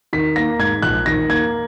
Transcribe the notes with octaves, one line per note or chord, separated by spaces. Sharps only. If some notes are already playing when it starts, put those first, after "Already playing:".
D#3 B6
A#3 A#6
G#2 G#6
A#1 F#6
D#3 A#6
A#3 G#6